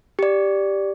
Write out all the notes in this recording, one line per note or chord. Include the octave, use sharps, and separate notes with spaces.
G4 D5